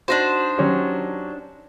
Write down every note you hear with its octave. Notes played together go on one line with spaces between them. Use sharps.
D4 D#4 F#4 C5
F#3 C#4 G4